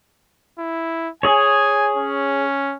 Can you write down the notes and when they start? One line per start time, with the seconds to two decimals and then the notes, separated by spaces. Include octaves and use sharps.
0.59 E4
1.23 G#4 C#5 G#5
1.97 C#4